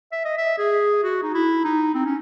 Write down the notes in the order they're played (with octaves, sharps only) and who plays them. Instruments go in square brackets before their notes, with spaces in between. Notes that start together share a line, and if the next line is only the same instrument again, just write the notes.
[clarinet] E5
D#5
E5
G#4
F#4
D#4
E4
D#4
C4
C#4